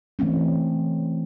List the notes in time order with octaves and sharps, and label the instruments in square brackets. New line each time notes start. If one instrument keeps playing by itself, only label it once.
[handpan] E3 A3 C4 C#4